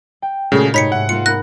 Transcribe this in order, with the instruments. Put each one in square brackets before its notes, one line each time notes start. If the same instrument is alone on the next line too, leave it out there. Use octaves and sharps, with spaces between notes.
[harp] G5
[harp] A#2 G#3 F#4 [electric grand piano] C#3 [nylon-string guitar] A3 G#4 A4
[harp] G#2 C3 [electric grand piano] D#4 [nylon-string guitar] C#5 [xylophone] B5 B6 C#7
[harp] G#2 E5 [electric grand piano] F#5
[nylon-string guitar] A#3 F4 [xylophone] C#7
[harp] D#4 A#4 B5 [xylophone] F#6 A#6